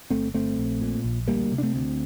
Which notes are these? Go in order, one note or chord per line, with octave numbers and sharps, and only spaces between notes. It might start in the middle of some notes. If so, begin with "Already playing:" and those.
G1 A3 C4
G1 A3 C4
A#1
A#2
A#1
D2 G3 A#3
C3
D4
A3 C4
D2